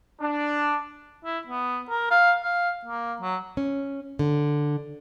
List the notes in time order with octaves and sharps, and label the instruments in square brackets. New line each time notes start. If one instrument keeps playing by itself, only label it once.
[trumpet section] D4
[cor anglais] E4
B3
A#4
F5
F5
A#3
F#3
[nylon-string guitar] C#4
D3